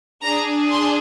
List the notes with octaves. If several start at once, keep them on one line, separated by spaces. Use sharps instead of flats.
D4 G#4 A#5
C6